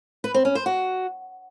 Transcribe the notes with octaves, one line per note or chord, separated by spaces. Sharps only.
B4
C4
C#4
C5
F#4